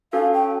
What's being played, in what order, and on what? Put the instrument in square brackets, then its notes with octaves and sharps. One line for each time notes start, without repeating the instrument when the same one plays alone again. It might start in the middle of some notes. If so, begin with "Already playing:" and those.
[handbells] C#4 F#4 A4 [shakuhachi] F5
[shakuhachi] G5